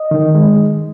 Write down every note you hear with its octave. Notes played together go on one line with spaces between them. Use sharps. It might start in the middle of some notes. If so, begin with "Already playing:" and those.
Already playing: D#5
D#3
G#3